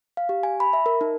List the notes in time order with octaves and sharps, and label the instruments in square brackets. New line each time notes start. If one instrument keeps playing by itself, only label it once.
[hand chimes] F5
G4
G#5
B5
E5
A#4
D#4